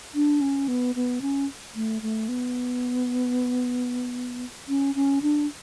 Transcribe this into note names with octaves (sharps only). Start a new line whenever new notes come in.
D4
C#4
B3
B3
C#4
A3
A3
B3
C#4
C#4
D4